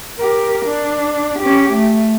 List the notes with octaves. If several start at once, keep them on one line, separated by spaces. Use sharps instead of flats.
G4 A#4
D4
C#4 G4
A3